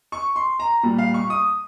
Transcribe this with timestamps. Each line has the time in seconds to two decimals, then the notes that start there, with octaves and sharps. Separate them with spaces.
0.12 C#6
0.36 C6
0.60 A#5
0.83 A#2 G3
0.98 F5
1.14 C#6
1.30 D#6